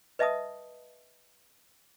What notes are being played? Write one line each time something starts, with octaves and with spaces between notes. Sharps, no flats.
B4 D#5 E5 A5 D#6